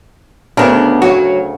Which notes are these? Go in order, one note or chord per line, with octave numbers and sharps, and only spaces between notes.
D2 C#3 B3 D4 A#4
F#3 F#4